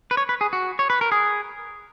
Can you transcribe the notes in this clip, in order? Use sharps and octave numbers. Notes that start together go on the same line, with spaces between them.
B4
C#5
B4
G#4
F#4
C#5
B4
A#4
G#4